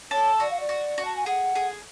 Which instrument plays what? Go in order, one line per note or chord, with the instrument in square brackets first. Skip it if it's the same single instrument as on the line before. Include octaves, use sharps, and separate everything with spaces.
[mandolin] A4 [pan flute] C#5
[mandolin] F#4 [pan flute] D5
[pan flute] F5
D5
[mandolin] F#4
F#4
[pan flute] A5
G#5
[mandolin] G#4 [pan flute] F#5
[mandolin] G#4